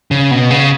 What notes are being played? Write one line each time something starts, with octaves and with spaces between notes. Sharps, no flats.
C#3
B2
C#3